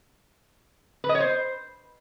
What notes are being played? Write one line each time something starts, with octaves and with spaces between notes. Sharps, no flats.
B4
D#5
C#5
C5